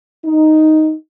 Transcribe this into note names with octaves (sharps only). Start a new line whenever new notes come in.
D#4